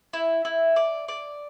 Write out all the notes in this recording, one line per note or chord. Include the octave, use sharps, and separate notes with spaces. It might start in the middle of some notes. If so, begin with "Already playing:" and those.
E4
E4
D5
D5